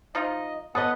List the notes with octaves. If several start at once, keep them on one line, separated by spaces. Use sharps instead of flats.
F3 D#4 F4 D#5
B3 A4 B4 C#5 D#5 F#5 D#6